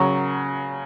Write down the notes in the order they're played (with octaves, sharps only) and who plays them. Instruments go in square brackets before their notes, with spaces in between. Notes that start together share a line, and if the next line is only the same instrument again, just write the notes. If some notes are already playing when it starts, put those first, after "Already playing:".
Already playing: [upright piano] C#3 F#3 [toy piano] A#4 F#5 A#5 C#6